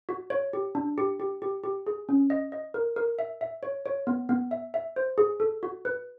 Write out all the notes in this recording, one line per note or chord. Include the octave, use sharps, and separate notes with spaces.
F#4
C#5
G4
D4
G4
G4
G4
G4
G#4
C#4
D#5
D#5
A#4
A#4
E5
E5
C#5
C#5
B3
B3
E5
E5
C5
G#4
A4
F#4
B4